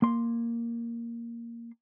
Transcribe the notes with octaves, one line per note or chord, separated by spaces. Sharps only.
A#3 C6